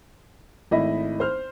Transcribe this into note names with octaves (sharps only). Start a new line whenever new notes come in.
G#1 A3 E4 D#5 B5
C5 F6